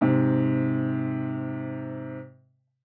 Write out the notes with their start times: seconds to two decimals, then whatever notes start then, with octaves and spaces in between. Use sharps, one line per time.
0.01 G#2 C3